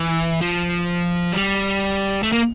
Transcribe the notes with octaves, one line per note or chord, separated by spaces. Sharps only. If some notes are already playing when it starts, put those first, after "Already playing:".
Already playing: E3
F3
G3
A3
A#3